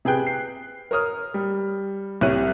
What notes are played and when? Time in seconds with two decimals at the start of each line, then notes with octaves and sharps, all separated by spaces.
0.05 C3 G#4 B4 G5 F#6
0.27 C7
0.91 A#4 C#5 D#6 F6
1.34 G3
2.21 C2 C3 C#5 F#6 D#7